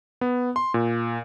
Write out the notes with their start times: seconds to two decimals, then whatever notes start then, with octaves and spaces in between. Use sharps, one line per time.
0.21 B3
0.56 C6
0.74 A#2